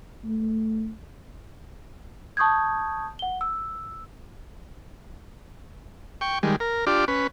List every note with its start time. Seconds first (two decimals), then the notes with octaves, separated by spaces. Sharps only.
0.25 A3
2.37 A5 C#6 D#6 G6 G#6
3.19 F#5 G7
3.41 E6
6.21 G5 C#6
6.43 D#3 G3 G#3
6.60 A#4
6.87 D4 F4 G4 D5
7.08 C#4 B4